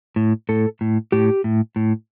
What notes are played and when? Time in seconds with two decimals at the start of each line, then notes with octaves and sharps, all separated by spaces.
0.16 A2
0.49 A2 A4
0.81 A2
1.12 A2 G4
1.44 A2
1.76 A2